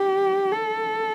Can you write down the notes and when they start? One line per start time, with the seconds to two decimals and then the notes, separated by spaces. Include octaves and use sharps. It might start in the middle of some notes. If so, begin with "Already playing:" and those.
Already playing: G4
0.52 A4